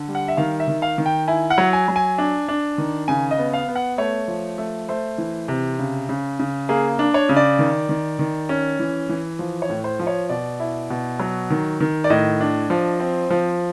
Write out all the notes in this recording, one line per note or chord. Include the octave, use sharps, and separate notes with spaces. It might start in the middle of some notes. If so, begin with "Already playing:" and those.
Already playing: D3
G3
F#5
E5
D#3 F5
E5
D#3
F5
D#3
G5
E4 G#5
F#5
F#3
G#5
F#3
G#5
D4
D4
D#3
C#3 G#5
D#5
B3
F5
B3
F#5
A3 C#5
F3
A3
A3 C5
E3
C3
C#3
C#3
C#3
A#3 G#4
D4
C#5
C#3
D5
D#3
D#3
D#3
C#4
E3
E3
F3
C#5
A2
C5
F3
C#5
B2 D5
E4
B2
F#3
D#3
D#3
D5
A2 D#5
D4
F3
C4
F3